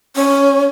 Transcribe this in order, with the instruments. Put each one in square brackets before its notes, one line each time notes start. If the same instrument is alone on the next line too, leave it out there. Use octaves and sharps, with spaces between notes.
[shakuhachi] C#4